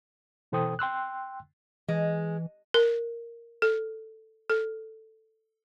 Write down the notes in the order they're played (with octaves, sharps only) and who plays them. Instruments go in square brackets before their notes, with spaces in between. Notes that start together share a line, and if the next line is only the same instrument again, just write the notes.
[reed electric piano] B2 E3 A4 C5 G5 D#6
G5 C6 E6 F#6
[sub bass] E3 [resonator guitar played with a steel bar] G#3
[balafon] A#4
A4
A4